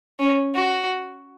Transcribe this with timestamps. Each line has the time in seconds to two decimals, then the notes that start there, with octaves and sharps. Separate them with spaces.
0.20 C#4
0.55 F#4